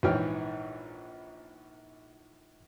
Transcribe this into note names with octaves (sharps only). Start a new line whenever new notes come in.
A#1 G#2 E3 C#5 G5 F6